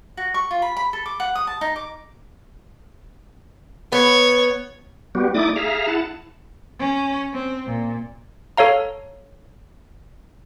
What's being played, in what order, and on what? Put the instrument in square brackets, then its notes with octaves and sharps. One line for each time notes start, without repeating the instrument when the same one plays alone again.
[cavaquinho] F#4
C#6
F4
B5
B5
A4
D6
F#5
D#6
A5
D#4
D6
[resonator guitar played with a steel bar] B3 [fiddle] C#5
[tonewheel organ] G3 B3 F#4 G4
A3 D#4 E4 D5 D6 D#6
G#4 E5 F5 A#5
E4 F#5 A5
[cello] C#4
C4
A#2
[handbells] A4 C#5 F5 A#5